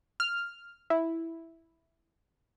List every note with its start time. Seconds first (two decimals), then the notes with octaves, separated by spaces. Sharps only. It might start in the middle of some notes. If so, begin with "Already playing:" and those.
0.20 F6
0.90 E4